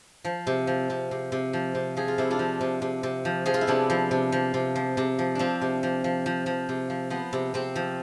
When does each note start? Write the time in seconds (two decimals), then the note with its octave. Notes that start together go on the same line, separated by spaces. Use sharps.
0.25 F3
0.47 C3
0.67 F3
0.90 C3
1.11 C3
1.32 C3
1.53 F3
1.75 C3
1.97 F3 G#4
2.08 F4
2.18 C3 E4
2.30 D4 F4
2.39 F3
2.61 C3
2.82 C3
3.03 C3
3.25 F3
3.46 F3 G#4
3.54 F4
3.61 E4
3.67 C3 B3 D4
3.90 F3
4.11 C3
4.32 F3
4.54 C3
4.76 F3
4.97 C3
5.19 F3
5.35 F3 C4 D4
5.61 C3
5.83 F3
6.04 F3
6.26 F3
6.46 F3
6.69 C3
6.90 F3
7.10 F3 B3
7.33 C3
7.54 C3 C4
7.76 F3